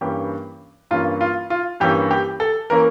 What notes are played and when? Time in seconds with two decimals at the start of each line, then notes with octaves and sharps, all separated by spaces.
0.01 G2 E3 A#3 C#4 G4
0.91 G2 E3 A#3 C#4 F4
1.21 F4
1.50 F4
1.80 G2 E3 A#3 C#4 G4
2.11 G4
2.40 A4
2.70 E3 A#3 C#4 A#4